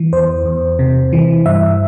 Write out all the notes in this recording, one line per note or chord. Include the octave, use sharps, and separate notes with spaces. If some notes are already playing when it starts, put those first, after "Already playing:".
Already playing: E3
E2 C5
E2
C3
E3
G2 E5